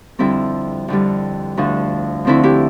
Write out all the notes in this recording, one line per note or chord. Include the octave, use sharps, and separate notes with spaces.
F2 D3 G3 C4 E4
F2 D3 G3
D2 D3 F3
D2 D3 F3 C4 E4
E4 G4